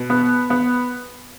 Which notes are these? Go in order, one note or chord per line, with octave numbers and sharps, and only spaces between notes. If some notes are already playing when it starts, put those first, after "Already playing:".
Already playing: B2
B3
B3